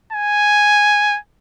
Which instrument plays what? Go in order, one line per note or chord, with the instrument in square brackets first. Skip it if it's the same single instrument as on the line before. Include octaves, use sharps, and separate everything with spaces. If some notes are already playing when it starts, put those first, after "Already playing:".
[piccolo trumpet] G#5